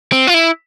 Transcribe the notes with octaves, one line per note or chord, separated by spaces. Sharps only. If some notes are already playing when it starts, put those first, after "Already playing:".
C4
F4
E4